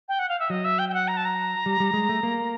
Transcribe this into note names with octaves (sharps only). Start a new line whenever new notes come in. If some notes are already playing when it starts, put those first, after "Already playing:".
G5
F#5
F5
E5
F#3 D#5
E5
G5
G5
F#5
A#5
A5
A#5
G3
G3
G#3
A3
A#3